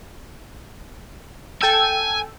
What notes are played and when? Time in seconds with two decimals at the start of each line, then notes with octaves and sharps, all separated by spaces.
1.62 A4 G5 G#5 E6